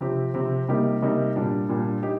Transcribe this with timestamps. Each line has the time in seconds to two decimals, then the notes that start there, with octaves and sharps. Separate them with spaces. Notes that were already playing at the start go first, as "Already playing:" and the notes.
0.01 C3 F3 C4 G4
0.34 C3 F3 C4 G4
0.68 C3 G3 A#3 D#4 G4
1.02 C3 G3 A#3 D#4 G4
1.36 A#2 G3 D4
1.69 A#2 G3 D4
2.03 D#4 G4